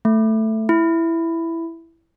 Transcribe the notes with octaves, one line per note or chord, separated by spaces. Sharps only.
A3
E4